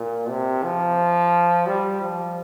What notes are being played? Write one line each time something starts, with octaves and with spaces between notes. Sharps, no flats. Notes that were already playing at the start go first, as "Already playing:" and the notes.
Already playing: A#2
C3
F3
G3
F3